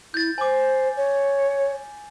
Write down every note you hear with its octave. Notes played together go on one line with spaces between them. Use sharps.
E4 G6 A6
C5 G#5 D6
C#5